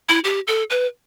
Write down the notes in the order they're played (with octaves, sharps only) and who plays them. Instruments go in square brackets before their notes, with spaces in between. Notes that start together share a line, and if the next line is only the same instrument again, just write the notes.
[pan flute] E4
G4
A4
B4